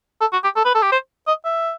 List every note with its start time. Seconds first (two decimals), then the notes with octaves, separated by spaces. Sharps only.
0.21 A4
0.33 F#4
0.44 G4
0.56 A4
0.65 B4
0.74 A4
0.82 G4
0.92 C5
1.27 D#5
1.45 E5